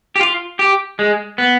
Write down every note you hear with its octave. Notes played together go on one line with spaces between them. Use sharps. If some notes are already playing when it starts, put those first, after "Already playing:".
G4
F4
G4
G#3
B3